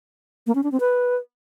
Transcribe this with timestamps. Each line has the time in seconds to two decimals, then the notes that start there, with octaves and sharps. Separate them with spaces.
0.47 A#3
0.55 C#4
0.63 D4
0.72 C4
0.80 B4